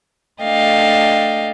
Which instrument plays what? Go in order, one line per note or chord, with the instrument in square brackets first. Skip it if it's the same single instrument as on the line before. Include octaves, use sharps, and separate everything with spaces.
[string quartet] A3 D4 D#5 F5 G5